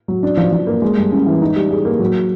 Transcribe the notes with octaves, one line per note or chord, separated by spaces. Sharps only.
F#3
D4
F3
F3
A#3
G#3
G2
C#4
E3
D#4
G3
G#4
A#3
F#3